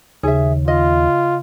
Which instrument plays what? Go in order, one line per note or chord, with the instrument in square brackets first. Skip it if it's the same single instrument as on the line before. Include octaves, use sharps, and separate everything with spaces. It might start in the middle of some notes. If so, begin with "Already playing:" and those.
[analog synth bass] D#2 [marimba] C#3 [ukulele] G#4 E5
[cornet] F4 [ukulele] D#5